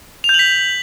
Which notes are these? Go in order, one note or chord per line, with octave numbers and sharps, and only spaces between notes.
F7
G6
F#7
B6